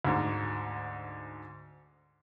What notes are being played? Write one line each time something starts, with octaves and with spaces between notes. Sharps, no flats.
D2 G#2